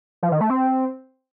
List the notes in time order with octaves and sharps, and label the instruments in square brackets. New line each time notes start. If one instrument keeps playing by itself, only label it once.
[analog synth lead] F3
D#3
A3
C4